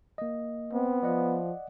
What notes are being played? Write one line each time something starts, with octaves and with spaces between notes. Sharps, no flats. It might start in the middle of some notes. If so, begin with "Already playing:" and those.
A#3 D#5
B3 C4
F3 D5 D#5 F#5